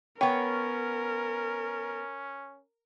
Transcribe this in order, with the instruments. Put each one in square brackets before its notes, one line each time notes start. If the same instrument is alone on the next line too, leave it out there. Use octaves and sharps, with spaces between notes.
[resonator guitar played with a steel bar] B3 C#5 [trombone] C#4 [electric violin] A#4 [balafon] G5